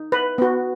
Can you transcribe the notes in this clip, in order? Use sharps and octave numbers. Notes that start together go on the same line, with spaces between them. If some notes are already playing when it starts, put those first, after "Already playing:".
Already playing: D#4
B4
B3 F#4